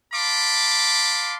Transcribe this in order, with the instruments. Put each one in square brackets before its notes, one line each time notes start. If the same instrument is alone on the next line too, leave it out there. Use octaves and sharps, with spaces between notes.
[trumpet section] F5 A5 B5 C6 D6